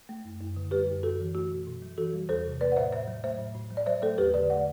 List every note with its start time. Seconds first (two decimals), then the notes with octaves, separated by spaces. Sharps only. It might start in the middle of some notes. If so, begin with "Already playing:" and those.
0.09 A3
0.25 F#2
0.41 F#2
0.56 D3
0.71 G3 G4 B4
0.88 F#2
1.03 F#2 F#4 A4
1.19 E3
1.34 A3 F#4
1.51 B2
1.67 B2
1.82 F#3
1.98 E3 F#4 A4
2.13 G3
2.29 E2 A4 C5
2.45 C3
2.61 A3 B4 D5
2.72 F#5
2.76 A2 C5 E5
2.92 A2 C5 E5
3.08 F#3
3.24 A3 C5 E5
3.39 A2
3.55 A2
3.70 F#3
3.77 D5
3.86 F#3 C5 E5
4.02 A3 A4 C5
4.18 E2 G4 B4
4.34 D3 B4 D5
4.50 A3 D5 F#5